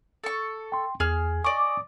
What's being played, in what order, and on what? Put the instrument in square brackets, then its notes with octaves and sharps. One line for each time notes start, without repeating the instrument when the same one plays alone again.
[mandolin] A4 C#6
[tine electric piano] G5 C6
[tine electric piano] E2 [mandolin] G#4 F6
[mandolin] D5 D#5 [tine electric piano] G#5 C#6 D6